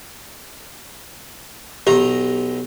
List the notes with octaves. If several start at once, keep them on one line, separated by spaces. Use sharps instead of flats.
B1 G4 A#5 C6